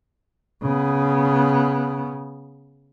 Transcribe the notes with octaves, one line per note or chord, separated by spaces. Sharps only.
C#3 B3